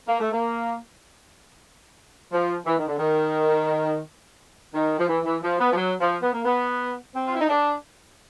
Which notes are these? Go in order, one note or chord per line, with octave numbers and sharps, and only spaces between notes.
A#3
A3
A#3
F3
E3
D#3
D3
D#3
D#3
F3
E3
E3
F3
B3
F3
F#3
F3
B3
A#3
B3
C4
F4
E4
D#4
D4